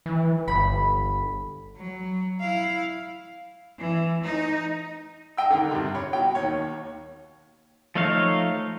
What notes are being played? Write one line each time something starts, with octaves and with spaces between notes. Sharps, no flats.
E3
G1 B5
F#3
E4 F5
E3
D#4
D#5 G5 E6
D3 D#3 A#4
G2 C3
C#5 B5
B2 G5
D#2 D#3 C#5
F3 A3 D#4 C#5 F5